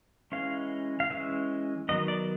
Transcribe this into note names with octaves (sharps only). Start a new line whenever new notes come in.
E3 G#3 C#4 F5
F5
E3 G#3 C#4 E5
D#3 F#3 B3 D#5
D5